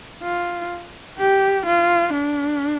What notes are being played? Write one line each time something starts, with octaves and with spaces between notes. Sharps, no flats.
F4
G4
F4
D4